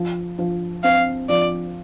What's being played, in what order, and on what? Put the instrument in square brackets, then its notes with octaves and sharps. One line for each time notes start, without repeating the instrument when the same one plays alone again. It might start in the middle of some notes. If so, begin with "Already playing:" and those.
Already playing: [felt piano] F3
F3
[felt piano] C4 [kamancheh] F5
[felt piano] F3 [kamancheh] D5